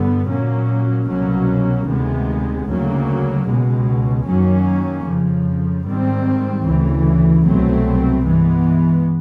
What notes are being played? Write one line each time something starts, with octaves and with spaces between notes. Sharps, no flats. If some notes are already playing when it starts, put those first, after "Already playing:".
Already playing: G2 D3 G3 B3
A#2 F#3 A#3 C#4
C2 B2 F#3 A#3 C#4
D2 C3 D#3 G#3 B3
D2 C#3 F#3 A#3
C#2 B2 G#3
F#2 D#3 F#3 A#3 C#4
F2 C#3 F3
G#2 D#3 G3 C4
D2 C#3 E3
C2 B2 F#3 A3 C4
G2 E3 G#3 B3